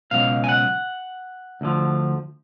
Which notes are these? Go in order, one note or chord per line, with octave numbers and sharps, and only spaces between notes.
C#2 B2 F#3 F5
G#5
F#5
D2 D3 F3